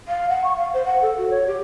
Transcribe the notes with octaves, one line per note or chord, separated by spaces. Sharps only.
F5
F#5
C#6
F5
C5
F#5
A4
F#4
C#5
G4